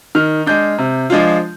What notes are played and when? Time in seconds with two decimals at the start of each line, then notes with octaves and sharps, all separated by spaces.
0.15 D#3 F6
0.46 G#3 D4 G6
0.78 C3
1.10 F3 G#3 D4 F4